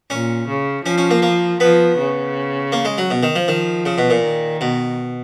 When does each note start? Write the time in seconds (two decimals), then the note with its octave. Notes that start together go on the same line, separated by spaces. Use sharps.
0.10 A#2 C#4
0.48 C#3
0.85 F3 C#4
0.98 C#4
1.11 A#3
1.22 A#3
1.60 F3 B3
1.98 C#3
2.72 A#3
2.85 G#3
2.98 F#3
3.11 B2
3.23 D#3
3.36 F3
3.48 D#3 F3
3.86 C#3
3.98 B2
4.10 A#2
4.23 D#3
4.61 B2